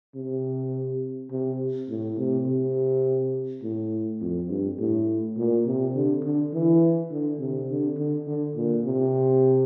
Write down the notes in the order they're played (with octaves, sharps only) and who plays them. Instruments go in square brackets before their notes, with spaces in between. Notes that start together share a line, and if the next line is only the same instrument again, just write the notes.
[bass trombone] C3
C3
A2
C3
C3
A2
F2
G2
A2
A#2
C3
D3
D3
E3
D3
C3
D3
D3
D3
A#2
C3